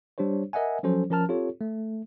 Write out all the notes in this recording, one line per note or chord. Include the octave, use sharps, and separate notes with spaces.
G3 D4 G4 C5 C#5
A#4 D#5 E5 F#5 G#5
F3 F#3 C#4 A4 C5
F3 C#4 A#4 A5 F6
C4 F4 G4 A4 C#5
A3